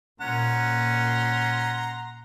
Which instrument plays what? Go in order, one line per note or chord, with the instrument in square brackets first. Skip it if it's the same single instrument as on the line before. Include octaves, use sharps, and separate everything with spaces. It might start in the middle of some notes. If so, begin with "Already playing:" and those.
[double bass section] A#2 [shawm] C#4 [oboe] F#5 [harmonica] A#5 C6